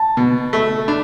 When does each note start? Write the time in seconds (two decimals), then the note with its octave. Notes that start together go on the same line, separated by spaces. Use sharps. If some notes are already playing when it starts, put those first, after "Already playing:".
Already playing: A5
0.17 B2
0.53 A3
0.88 D4